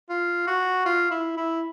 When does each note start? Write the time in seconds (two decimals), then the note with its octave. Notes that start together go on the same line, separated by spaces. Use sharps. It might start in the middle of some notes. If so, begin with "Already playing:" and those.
0.10 F4
0.47 F#4
0.85 F4
1.11 E4
1.37 E4